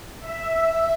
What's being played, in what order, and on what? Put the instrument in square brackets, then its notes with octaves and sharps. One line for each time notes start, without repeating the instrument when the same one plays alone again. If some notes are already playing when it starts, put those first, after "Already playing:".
[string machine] E5